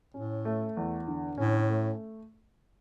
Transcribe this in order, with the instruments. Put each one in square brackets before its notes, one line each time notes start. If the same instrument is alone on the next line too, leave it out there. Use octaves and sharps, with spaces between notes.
[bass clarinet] A2 [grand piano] C#4
[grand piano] A3
E2
D3
[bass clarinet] A2 [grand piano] C#4
[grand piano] A3